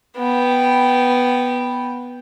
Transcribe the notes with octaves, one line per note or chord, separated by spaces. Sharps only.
B3 G5